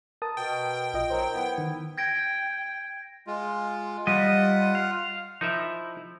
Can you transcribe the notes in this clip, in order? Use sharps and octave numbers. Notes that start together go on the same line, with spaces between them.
A#4 A5 D#6
B2 G5
A#1 F4 D#5
D#3 F#3 A#4 C5
B3 E4
D#3
G5 G#6 A#6 D7
G#3 F4
G3 F4 D#5 F#5
F5
F3 D#4 E4 A#4 E5